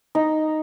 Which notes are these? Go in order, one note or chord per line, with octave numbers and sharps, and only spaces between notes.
D#4